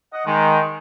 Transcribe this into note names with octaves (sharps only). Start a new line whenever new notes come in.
D#5 F#5
D#3 G#3